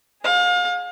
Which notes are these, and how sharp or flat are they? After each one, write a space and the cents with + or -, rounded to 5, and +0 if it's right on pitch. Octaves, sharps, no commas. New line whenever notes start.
G#4 +0 F5 +35